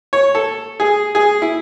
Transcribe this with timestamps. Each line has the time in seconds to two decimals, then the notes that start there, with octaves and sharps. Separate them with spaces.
0.13 C#5
0.35 A4
0.80 G#4
1.15 G#4
1.42 E4